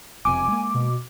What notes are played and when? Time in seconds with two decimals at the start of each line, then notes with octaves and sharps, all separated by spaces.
0.25 E1 F2 C3 G#5 D6
0.48 G#3 A#3
0.74 B2